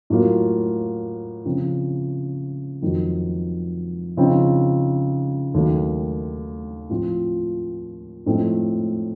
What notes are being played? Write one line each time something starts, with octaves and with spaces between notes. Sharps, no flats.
A2 F#3 A#3 F4
C#3 F3 C4
F2 D#3 F#3
C#3 F3 C4 D#4
D#2 D#3 F#3 A3
A2 F3 C4 F4
A2 F3 A3 C4 D#4